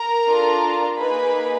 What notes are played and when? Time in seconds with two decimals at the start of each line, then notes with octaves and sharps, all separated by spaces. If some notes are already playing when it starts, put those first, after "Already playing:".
Already playing: A#4 A#5
0.26 D4 F4 A4
0.97 A#3 D#4 G#4 B4 B5